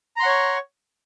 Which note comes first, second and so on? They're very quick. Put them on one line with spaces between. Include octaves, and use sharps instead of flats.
A#5 C6 F#5 C#5 C#6